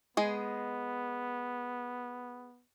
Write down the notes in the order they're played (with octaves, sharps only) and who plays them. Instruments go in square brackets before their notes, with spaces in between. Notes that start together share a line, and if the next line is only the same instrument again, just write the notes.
[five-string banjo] G#3 G#4 [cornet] B3